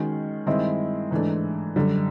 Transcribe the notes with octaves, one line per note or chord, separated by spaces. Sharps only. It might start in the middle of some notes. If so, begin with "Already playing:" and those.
Already playing: D#3 G#3 C#4 F#4
G2 D#3 G#3 C4 E4
G#2 E3 A3 D4
F#2 D3 G3